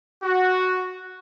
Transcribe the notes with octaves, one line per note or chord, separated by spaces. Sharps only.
F#4